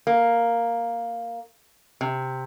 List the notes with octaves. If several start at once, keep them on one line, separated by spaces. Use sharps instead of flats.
A#3
C3